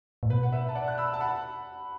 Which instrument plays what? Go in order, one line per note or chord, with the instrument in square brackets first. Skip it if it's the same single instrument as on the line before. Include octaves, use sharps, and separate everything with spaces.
[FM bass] A2
[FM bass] B2 [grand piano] B4
[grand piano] F#5
B4 E5
A5
D5 F#5
F#6
B5 E6
A5
F#5 B5